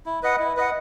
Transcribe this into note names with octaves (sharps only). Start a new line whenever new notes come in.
E4
B4 D#5 F#5
E4
B4 D#5 F#5